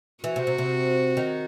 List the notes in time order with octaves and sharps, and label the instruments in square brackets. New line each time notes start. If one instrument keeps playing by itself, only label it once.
[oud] E3 [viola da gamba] F#4
[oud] C3
C3
C3
D#3